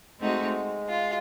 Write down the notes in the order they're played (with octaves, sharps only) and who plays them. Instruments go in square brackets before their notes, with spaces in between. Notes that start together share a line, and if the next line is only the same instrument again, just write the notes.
[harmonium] G#3 [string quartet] A3 C4 D#4 F#4
[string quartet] F4